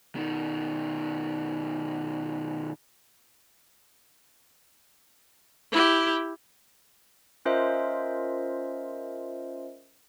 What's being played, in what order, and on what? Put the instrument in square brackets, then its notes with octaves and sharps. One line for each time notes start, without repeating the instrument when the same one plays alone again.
[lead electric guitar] B2 D#3
[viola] E4 G4
[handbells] C#4 F4 A#4 C5 D#5 E5